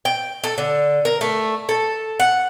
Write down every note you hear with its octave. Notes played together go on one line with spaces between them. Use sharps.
G5
A4
D3
A#4
A3
A4
F#5